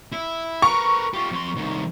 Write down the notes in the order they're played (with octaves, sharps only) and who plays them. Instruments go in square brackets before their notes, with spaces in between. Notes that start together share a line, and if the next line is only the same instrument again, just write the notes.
[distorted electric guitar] E4
[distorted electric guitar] A#4 B4 [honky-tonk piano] C#6
[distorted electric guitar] F4 G4
F2 C6
C2 D#3